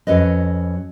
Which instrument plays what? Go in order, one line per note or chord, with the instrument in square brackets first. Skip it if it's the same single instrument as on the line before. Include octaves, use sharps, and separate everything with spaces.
[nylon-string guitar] F2 C#4 F#4 B4 D#5